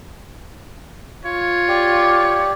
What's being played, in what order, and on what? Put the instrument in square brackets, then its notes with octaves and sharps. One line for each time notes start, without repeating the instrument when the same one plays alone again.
[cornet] F4 [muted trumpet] C#5
[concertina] G4 D5